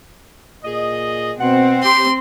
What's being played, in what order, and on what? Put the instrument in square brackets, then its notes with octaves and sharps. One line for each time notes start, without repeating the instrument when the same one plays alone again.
[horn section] A#2 G#4 D#5
[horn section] B2 F#5 [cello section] C4
[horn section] G4 [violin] C6